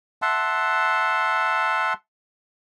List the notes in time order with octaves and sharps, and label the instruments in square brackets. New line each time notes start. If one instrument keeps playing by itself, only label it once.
[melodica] E5 F#5 A5 C6